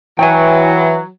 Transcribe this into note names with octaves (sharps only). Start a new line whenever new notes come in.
E3 F#3 G5 G#5